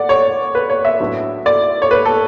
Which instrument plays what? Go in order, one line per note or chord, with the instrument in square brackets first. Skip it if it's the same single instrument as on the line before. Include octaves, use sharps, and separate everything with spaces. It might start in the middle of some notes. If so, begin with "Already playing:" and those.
Already playing: [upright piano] D5 F#5
C#5
B4
C#5
E5
A2 F#3 B3 D4
D5
C#5
B4
A4